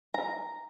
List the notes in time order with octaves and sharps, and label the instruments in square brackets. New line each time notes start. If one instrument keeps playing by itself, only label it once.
[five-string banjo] A#5